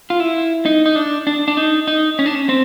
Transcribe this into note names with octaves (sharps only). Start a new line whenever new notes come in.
F4
E4
D#4
D#4
D4
D4
D4
D#4
D#4
C#4
D4
C#4
C4